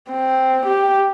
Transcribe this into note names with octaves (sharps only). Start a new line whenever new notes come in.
C4
G4